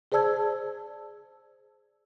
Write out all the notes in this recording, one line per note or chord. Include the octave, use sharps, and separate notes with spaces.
G#4 C5 D5 A5 E6 G#6